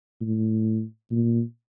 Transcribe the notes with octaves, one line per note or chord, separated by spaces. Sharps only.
A2
A#2